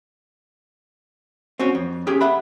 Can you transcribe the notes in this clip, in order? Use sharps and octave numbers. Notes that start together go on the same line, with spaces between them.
C4 C#4 F#4
F2
C#4 G4 G#4 G5
E5 F#5 B5